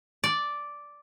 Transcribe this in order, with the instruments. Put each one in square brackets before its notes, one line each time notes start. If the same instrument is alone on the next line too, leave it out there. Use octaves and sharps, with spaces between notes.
[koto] D5